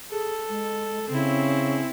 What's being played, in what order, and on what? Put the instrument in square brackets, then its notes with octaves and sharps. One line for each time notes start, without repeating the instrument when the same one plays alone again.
[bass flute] G#4 [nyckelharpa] A4
[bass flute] G#3
[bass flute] C#3 [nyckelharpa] C4 E4